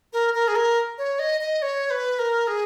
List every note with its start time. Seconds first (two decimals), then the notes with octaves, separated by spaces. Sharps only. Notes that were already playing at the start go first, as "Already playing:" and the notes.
0.13 A#4
0.34 A#4
0.48 G#4
0.55 A#4
0.98 C#5
1.19 D#5
1.41 D#5
1.62 C#5
1.90 B4
2.19 A#4
2.47 G#4